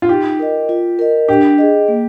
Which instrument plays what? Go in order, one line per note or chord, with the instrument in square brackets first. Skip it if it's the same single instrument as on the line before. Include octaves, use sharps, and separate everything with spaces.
[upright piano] F4
[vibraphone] D#4 [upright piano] G4
[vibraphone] A#4 D#5
F4
A#4 D#5
[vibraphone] D4 [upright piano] G4
[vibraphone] G#4 D#5
A#3